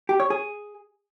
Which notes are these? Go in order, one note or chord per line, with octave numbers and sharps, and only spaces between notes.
G4
C#5
G#4